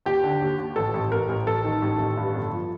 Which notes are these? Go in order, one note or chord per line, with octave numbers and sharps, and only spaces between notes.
D#2 G4
D3
D#2
D#2
A1 A4
A1
A1 A#4
A1
A1 A4
D#3
A1
A1
G2
G1
F3